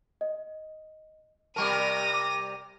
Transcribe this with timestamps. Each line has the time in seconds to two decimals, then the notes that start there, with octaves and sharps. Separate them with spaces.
0.21 D#5
1.56 C3 G3 A#4 A5 C#6 D6 A#6 D#7
2.13 D6